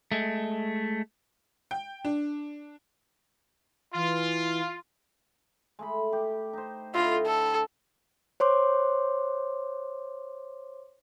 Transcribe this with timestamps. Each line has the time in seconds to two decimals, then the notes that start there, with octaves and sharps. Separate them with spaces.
0.12 G#3 A3
1.71 G5
2.05 D4
3.94 E3 F4
5.79 G#3 A3 B5
6.13 G4
6.53 D#4 C5
6.94 D3 E4 F4 D#5
7.26 A4
8.40 C5 C#5 C6 D6